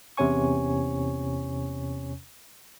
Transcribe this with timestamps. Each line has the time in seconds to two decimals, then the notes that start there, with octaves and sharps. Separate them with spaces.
0.17 E2 C3 C#4 C#5 G#5 C#6